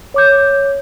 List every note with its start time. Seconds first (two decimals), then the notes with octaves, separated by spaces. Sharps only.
0.14 C#5 D6 G6